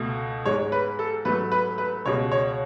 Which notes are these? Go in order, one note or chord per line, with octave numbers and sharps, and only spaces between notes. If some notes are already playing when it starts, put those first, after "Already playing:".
Already playing: C#2 B2 A3
G#2 G#3 C#5
B4
A4
G#2 F#3 A3 B4
B4
B4
C#2 B2 G#3 C#5
C#5